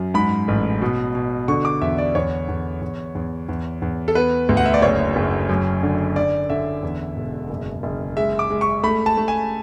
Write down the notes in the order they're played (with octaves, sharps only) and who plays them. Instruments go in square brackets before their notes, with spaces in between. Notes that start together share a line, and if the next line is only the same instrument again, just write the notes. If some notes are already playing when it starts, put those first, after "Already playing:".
Already playing: [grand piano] F#2 F#3
G#2 B5
A1
B2
B2
D3 C#6
D6
E2 E5
D5
E2 C#5
E2
E2
E2
E2
E2
A4
B3 B4
D2
F#5
E5
D5
F#1 C#5
F#1
F#2
D3
D3 D5
D3 E5
E2
E1
F#1
F#1
G#3 E5
D6
G#3
C#6
A3 B5
A5
A3
G#5